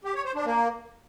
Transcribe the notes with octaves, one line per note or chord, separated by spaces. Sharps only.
G4
C#5
C5
D4
A#3